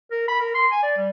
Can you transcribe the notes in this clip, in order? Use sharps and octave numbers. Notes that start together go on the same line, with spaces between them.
A#4
B5
A#4
C6
G#5
D5
G3